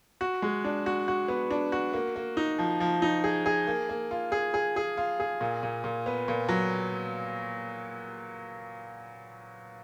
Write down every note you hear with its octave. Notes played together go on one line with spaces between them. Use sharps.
F#4
G#3
D4
F#4
F#4
B3
D4
F#4
A#3
A#3
D#4
F3
F3
D#4
G#4
G#4
A#3
A#3
F4
G#4
G#4
G#4
F4
G#4
A#2
A#2
A#2
B3
A#2
F#3